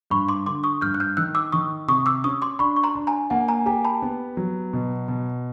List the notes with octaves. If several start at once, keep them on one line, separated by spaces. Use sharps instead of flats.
G2 B5 C#6
C6 D6
D3 C6 D6
C#6 D#6
G2 F6 G6
F#6
F6 G6
D#3 E6 F#6
D6 E6
D#3 C#6 D#6
C3 C#6 D#6
D6 E6
C#4 C#6 D#6
C6 D6
D4 B5 C#6
C#6
A#5 C6
D4
G#5 A#5
A#3 F#5 G#5
G#5 A#5
G4 G#5 A#5
A5 B5
B3
F#3
B2
B2